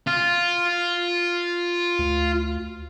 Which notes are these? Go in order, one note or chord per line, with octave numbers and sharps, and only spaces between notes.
F4
D2